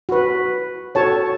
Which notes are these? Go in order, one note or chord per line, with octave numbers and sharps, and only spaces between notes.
F#4 B4
F#4 A4 C#5 A5